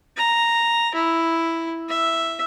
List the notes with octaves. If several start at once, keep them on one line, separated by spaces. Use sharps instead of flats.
A#5
E4
E5